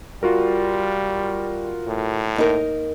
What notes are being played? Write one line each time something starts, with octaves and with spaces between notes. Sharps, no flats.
G3 F4 F#4 A#4
A2
A#3 D#4 A#4